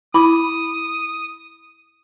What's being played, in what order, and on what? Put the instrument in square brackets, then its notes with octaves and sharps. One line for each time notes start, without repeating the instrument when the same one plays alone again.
[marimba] E4 D6 [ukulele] B5 [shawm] D#6